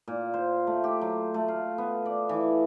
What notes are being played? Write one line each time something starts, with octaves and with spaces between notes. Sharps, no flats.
A#2
C5
A3
G4
F#3
A3
F5
B3
D5
E3